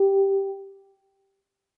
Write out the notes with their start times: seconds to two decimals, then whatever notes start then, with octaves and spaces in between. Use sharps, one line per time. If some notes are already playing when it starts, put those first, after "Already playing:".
Already playing: G4